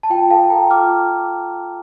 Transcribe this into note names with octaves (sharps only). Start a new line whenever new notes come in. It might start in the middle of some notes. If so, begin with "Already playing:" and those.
A5
F4 G5
A4 F5 A5
A4 G5 A#5
F4 D6 F6